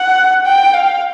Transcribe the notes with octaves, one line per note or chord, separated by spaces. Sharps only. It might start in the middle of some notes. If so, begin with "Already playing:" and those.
Already playing: F#5
G5
F5